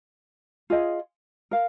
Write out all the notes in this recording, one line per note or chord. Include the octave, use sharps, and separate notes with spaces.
F4 G#4 D#5
A#4 F5